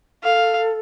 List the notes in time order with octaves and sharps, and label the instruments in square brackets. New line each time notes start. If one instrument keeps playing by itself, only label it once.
[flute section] A4 [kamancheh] F5